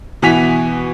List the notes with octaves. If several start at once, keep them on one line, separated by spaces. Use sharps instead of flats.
B2 E3 F#4 G#5 B6 F7